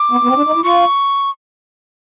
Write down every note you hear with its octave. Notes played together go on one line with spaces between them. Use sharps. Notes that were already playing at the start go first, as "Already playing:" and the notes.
Already playing: D6
B3
B3
C4
D4
D#4
E4
F4 C#6